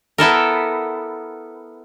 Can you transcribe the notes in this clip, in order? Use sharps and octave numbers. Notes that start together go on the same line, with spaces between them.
B3 E4 A4 A#4